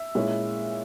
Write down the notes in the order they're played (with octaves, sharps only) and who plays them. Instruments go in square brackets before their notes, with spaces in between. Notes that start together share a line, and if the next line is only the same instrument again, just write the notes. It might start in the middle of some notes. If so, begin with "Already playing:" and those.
Already playing: [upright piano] E5
A#2 G#3 C#4 E4